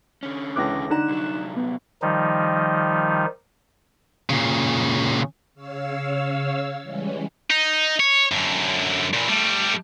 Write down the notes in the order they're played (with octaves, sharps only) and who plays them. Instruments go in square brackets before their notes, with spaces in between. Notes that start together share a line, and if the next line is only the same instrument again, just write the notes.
[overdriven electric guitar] D3 C#4
[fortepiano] C#2 E3 F#6 [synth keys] D6 A#6
[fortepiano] D3 A#5 [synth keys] D#4 F#6 E7
[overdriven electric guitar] C2 F#3
[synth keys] B3
[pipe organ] D#3 F3 G3 D#4
[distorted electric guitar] A#2 C#3
[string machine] C#3 C#5 F5 E6
E3 G3 G#3 C#4
[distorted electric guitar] D#4
C#5
F#2 D3
A#2 E3
G3 A3